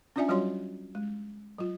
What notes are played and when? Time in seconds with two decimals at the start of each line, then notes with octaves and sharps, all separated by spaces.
0.16 C#4 D4 F4 D5 E5 G#5
0.28 F#3 G3 F4 F#4 C#5 C6
0.95 G#3
1.58 F#3 F4